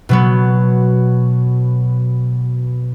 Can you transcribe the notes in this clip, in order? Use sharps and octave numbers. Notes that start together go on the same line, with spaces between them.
B2 F#3 B3